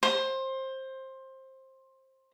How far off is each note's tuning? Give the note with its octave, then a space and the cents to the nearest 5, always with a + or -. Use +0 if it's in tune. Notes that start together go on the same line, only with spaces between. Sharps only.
C5 +20